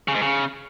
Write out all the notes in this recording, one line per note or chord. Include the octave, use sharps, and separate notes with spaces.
C#3
G#2
C#3